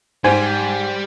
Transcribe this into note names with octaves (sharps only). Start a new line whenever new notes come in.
G#2 G3 C5 G#5